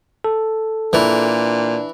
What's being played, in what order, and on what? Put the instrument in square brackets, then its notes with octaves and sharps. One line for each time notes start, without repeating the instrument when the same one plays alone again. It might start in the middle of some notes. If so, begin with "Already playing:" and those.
[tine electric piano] A4
[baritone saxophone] A#2 [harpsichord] E3 [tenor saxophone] D4